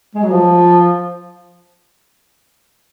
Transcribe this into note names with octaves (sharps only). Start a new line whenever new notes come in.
G#3
F#3
F3